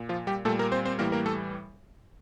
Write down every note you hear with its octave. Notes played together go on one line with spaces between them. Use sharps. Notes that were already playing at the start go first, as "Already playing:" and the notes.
Already playing: A#2
F3 F4
G3 G4
A#2 G3 A3 A4
A#3 A#4
C4 C5
C4 C5
A2 E3 G3 A#3 A#4
A#3 A#4
A3 A4